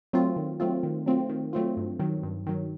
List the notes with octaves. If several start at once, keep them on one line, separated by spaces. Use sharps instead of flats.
F#3 A3 C4 F4
D#3
F#3 A3 C4 F4
D#3
F#3 A3 C4 F4
D#3
F#3 A3 C4 F4
G2
D#3 F#3
G2
D#3 F#3